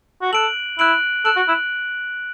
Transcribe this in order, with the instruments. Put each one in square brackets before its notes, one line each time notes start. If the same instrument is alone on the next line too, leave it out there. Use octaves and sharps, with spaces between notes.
[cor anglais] F#4
[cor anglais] A4 [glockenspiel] F#6 D7 F#7
[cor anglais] E4 [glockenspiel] F#6 D7 F#7
[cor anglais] A4 [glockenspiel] F#6 D7 F#7
[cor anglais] F#4
E4